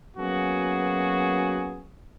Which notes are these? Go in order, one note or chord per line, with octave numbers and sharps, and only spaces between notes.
F#3 A#3 B3 C#4 F#4 G#4